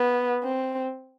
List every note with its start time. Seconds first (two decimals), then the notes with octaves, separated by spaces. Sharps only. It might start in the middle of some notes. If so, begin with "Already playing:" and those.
Already playing: B3
0.43 C4